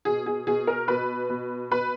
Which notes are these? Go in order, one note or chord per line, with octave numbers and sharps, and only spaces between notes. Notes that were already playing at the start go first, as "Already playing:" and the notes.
B2 G#4
G#4
B2 G#4
A#4
B2 B4
B2
B2 B4